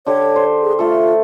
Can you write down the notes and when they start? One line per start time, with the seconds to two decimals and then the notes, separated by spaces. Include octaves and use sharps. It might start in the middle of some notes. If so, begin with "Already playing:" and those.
0.07 D3 G4 C#5
0.36 C5
0.62 G#4
0.79 A3 F4 A4